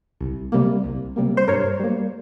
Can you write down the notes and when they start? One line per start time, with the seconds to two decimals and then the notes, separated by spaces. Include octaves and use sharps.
0.21 C2
0.52 C3 G3 A#3
0.84 C2
1.16 C3 G3 A#3
1.37 C5
1.48 G2 A#4 C#5
1.80 G3 A#3